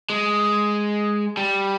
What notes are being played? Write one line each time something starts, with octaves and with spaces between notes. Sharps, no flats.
G#3
G3